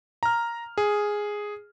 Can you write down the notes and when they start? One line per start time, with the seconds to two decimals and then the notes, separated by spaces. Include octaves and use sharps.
0.23 A#5 F6
0.78 G#4